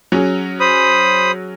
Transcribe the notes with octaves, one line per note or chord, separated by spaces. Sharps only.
F#3 C#4 G#4
C5 B5 D#6